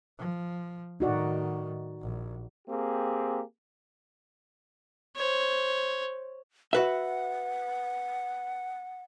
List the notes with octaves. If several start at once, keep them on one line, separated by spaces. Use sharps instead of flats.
F3
A2 D#3 D#4 F#4 D5
A#1
A#3 C4 G4 G#4
C5 C#5
F#4 B4 E5 F#5